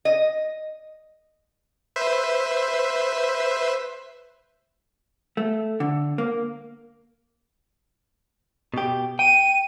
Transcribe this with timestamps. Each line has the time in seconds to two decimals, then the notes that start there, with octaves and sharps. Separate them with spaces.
0.05 D#5
1.96 B4 C5 E5
5.37 A3
5.80 D3
6.18 A#3
8.74 B2 G4
9.19 G5 D#7